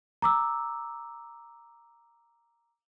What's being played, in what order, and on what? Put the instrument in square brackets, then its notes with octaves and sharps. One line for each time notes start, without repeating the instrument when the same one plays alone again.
[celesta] A#5 D6 E6